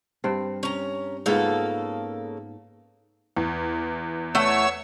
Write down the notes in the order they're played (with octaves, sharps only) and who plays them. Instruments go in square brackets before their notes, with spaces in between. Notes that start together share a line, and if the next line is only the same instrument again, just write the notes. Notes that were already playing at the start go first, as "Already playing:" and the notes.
[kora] G2 C4
[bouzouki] C#4 A#5
[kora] G#2 B3 F4 [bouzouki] C#3 A#3 A4
[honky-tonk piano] E2
[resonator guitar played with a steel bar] A3 F#5 [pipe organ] C#5 E6